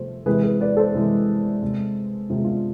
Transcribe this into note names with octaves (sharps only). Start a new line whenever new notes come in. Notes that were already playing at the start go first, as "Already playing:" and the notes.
Already playing: C3 F3 A3 C5
C3 E3 G#3 G#4 B4
G#4 B4
B4 D5
A4 C5
C3 E3 G#3
C3 G#3
C3 G#3 F4
G#4
D4 F4